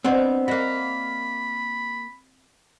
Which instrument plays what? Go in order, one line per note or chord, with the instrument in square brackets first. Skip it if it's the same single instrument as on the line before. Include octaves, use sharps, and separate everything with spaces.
[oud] B3 D4 C5 [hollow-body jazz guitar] C4 [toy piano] D5 D#5 F#5
[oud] A#3 F#4 [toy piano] D#5 E5 [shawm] B5